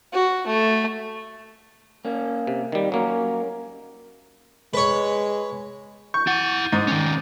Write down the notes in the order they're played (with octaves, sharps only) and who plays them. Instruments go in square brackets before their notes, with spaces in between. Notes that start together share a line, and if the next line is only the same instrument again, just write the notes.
[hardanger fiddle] F#4
A3
[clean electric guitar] A#3 C#4
[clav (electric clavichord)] C3
D#3 G3
[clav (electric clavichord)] F#3 A#3 [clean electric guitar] C#4 A#4
[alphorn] G#3 [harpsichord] B4 C#5
[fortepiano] C#6 [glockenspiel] G6
[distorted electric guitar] E4 F#5 [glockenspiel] A6 D#7
[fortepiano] G#2 [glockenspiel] D6 A6
[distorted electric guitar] D#3 C#4